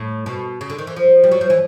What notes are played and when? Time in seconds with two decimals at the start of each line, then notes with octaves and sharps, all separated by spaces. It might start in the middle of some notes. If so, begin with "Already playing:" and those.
Already playing: A2
0.26 B2
0.61 C#3
0.70 D3
0.78 D#3
0.87 E3
0.96 F3
1.24 G3
1.31 F#3
1.41 F3
1.50 E3